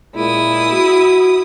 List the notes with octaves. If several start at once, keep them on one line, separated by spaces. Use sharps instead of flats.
A#2 G#3 E4 D#6
F#4